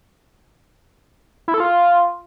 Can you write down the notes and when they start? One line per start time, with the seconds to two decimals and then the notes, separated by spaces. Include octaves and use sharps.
1.48 E4
1.54 A4
1.60 F4